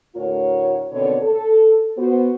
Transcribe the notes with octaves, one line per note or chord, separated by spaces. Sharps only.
D2 A2 F#4 A#4 C#5
B2 D3 D#3 B3 C4 C#5
A4
B3 F#4 C5